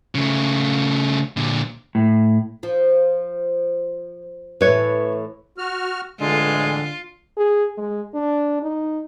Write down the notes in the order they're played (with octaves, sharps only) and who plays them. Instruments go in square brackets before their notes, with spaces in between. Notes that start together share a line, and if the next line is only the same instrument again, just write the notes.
[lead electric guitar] C#3 A3
A#2 D3
[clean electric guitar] A2
[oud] F3
[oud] A2 E3 [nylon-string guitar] B4 C#5
[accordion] F#4 F6
[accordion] F2 A2 E3 [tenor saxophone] D3 [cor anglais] G#3 [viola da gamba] F4
[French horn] G#4
G#3
D4
D#4